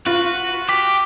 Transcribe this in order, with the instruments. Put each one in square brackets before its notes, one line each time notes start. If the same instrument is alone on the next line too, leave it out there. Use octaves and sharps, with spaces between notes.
[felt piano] F4 [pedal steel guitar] F#4 [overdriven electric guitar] B4
[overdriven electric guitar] G4 [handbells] D6 B6